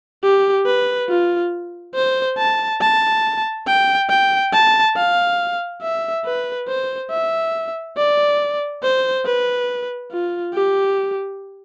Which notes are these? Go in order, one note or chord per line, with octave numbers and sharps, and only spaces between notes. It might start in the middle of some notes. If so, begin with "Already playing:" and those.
G4
B4
F4
C5
A5
A5
G5
G5
A5
F5
E5
B4
C5
E5
D5
C5
B4
F4
G4